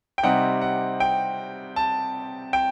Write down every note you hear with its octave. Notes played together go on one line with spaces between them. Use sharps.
G5
C3 G3 C4 D#4 F#5
F#5
G5
A5
G5